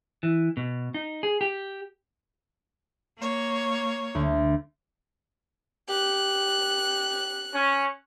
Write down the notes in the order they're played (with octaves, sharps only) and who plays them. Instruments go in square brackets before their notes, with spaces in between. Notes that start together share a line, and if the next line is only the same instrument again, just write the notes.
[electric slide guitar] E3
B2
D#4
G#4
G4
[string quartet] A#3 C#5
[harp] D2
[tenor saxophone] G4 [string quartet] F#6
[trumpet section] C#4